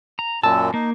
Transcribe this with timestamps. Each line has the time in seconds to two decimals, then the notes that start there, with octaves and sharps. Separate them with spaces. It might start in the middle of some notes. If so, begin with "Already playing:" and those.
0.19 A#5
0.43 F#2 A#2 A5 E6
0.74 A#3 D#4